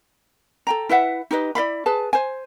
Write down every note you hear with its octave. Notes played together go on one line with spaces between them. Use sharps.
A4 G5 A#5
E4 B4 E5 F#5
D#4 G4 B4 D#5
E4 D5 F5 B5
G#4 B4 A5
C5 G#5